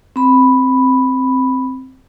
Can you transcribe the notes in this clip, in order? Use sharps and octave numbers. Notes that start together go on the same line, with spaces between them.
C4 B5